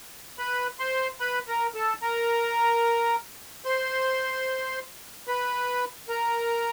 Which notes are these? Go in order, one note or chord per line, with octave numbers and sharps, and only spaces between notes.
B4 B5
C5 C6
B4 B5
A#4 A#5
A4 A5
A#4 A#5
C5 C6
B4 B5
A#4 A#5